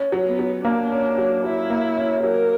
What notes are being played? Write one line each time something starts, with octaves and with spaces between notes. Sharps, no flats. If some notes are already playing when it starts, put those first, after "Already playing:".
Already playing: C#4
F#3
B3
F#3
A#3 D4
C#4
F#3
F#3 E4
A#3
C#4
F#3 A#4